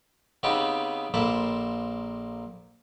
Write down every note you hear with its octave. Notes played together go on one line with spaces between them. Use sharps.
C#3 B3 C4 D#4 G4 B4
A#1 A#3 A4 C5 B5